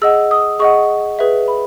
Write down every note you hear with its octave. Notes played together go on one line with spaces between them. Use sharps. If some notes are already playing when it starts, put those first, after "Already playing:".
G#4 D#5 F#5 E6
D#6
G#4 D#5 F#5 C#6
G#4 B4 E5
B5